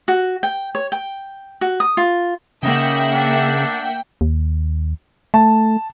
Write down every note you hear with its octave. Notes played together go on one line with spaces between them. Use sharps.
F#4
G5
C#5
G5
F#4
D#6
F4
C#3 A#3 D#4 E5 F#5 G5
D4
D#2
A3 A5